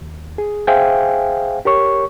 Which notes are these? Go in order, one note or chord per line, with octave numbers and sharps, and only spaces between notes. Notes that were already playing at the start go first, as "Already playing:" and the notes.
D#2
G#4
G#4 C5 E5 F5 G5 G#5
G4 A#4 C#5 C#6